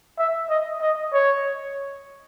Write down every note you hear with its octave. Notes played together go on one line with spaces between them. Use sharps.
E5
D#5
D#5
C#5